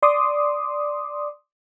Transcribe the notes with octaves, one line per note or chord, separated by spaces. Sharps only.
D5 C6 D6 D#6